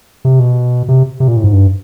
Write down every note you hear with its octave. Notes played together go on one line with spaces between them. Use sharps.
C3
B2
C3
C3
A#2
A2
G#2
G2